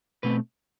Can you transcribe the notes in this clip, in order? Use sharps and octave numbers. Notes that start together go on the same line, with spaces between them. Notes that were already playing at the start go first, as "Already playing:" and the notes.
B2 A3 C4 B4